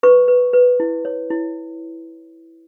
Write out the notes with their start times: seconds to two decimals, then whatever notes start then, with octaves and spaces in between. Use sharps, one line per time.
0.03 B4 C#6
0.28 B4
0.53 B4
0.80 E4
1.05 C#5
1.30 E4